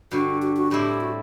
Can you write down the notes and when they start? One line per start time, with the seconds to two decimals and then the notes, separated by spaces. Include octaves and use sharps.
0.11 G2 D3 G3 F#4
0.42 F#4
0.57 F#4
0.71 A2 G3 C4 E4 G4
1.01 F#4